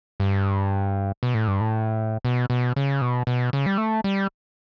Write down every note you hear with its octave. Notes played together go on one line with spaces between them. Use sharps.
G2
B2
A2
G2
A2
B2
B2
C#3
B2
B2
C#3
G3
A3
G3